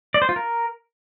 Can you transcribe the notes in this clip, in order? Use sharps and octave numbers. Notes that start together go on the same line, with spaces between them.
D5
C5
F4
A#4